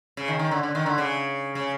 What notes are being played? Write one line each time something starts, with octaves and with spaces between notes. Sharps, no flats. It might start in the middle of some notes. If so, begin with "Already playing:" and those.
C#3
D#3
D#3
D3
D3
D#3
D3
C#3
C#3